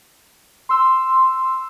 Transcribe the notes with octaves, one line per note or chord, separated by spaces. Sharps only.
C6 E6